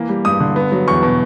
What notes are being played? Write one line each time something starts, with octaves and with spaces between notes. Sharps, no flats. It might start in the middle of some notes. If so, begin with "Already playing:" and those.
Already playing: E3 A#3
G3
G2 D#6
D3
B3
F#3
E2 C#6
B2